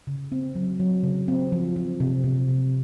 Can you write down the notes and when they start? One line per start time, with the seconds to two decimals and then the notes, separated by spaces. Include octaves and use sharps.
0.07 C#3
0.32 C4
0.55 F#3
0.80 F#3
1.03 C#3
1.28 C4
1.52 F3
1.76 F3
2.00 C3
2.24 C3
2.49 C3